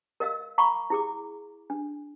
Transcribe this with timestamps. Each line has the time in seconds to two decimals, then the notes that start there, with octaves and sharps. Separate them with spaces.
0.20 A#4 D#5 F5 E6
0.58 F5 A#5 B5 C#6 D6
0.90 E4 G#4 D6
1.70 D4